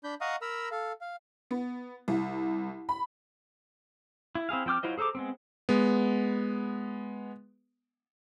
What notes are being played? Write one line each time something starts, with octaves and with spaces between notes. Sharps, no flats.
D4 B5 G6
D#5 F5 F#5 A#5 C#6 D#6
A#4 A#5 B5 E6
A4 F5
F5
B3
C2
B5
E4
C4 E4 G#4 F5
F3 C4 G5 D6 F6
F#3 E4 F4 C5 D#5
G#4 A4 C5 A#5 D6
G#3 B3 C4
G#3 B3